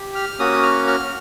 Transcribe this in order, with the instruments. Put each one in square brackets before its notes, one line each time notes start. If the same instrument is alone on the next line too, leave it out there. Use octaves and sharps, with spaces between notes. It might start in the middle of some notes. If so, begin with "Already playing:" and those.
Already playing: [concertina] G4
F6
A#3 C#4 F#4 D#6
F6
F6